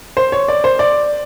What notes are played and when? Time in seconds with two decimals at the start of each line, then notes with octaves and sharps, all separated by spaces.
0.17 C5
0.32 C#5
0.48 D5
0.64 C5
0.79 D5